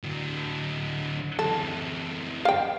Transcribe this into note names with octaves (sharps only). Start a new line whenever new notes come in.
D3 F#3
F#2 E3 A4
F5 G5